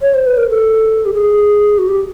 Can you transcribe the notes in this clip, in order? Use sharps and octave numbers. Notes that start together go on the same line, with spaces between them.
C#5
C5
B4
A#4
A4
G4
G#4
F#4
G4